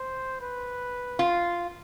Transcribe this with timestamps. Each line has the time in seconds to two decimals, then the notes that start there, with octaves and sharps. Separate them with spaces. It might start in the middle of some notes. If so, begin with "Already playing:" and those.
Already playing: C5
0.40 B4
1.19 F4